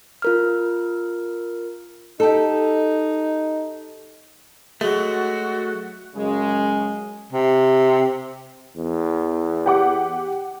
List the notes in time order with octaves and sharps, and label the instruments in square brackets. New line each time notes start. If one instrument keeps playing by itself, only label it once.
[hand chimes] F4 A#4 F6
[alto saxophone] D#4 [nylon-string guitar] G4 A4
[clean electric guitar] F#3 A3 [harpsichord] G#3 [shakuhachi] F#4
[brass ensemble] F#2 C#3 G#3
[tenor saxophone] C3
[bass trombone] E2
[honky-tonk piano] G4 F#5 D6